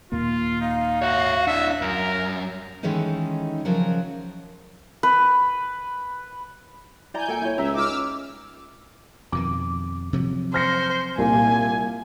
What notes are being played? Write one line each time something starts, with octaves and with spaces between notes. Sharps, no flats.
D#2 A#2 A#3 F4
D#4 F5
F#4 C#5 E5
D4 E4 E5
F#2 A#4
D#3 E3 G#3 A3 C#4 D#4
C#3 F3 F#3 F#4 A#4
B4
E4 D5 G#5 A#5 G6
A#2 A4 G5 A#5
E4 C#5
C#2 E5 A#5
D#4 D6 E6 F6
F2 B2 D#3 D6
C3 F3 F#3
C5 F6 A#6 C#7
C2 A#2 G#5